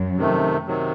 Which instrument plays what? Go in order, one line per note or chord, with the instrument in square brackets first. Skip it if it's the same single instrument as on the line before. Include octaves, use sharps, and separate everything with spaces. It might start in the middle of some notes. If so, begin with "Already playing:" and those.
Already playing: [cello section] F#2
[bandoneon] C3 D#3 A3
C3 D#3 F#3